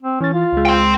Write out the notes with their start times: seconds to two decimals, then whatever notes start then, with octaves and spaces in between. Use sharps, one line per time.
0.03 C4
0.21 E3 C#4 A6
0.34 F4
0.53 C#2 G#3
0.65 G5 C6